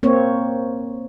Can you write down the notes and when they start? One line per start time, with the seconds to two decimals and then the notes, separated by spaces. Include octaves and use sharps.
0.03 A#3 C4 C#5